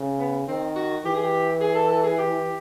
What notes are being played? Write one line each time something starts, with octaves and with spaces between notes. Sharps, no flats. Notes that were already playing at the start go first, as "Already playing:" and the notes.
Already playing: C#3
B3
D#3 C4
F#4
E3 G4
G#4
G4
G#4
A4
A4
G#4
G4